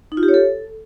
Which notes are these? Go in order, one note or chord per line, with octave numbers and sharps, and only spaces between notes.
D#4
F4
G4
C#5
A4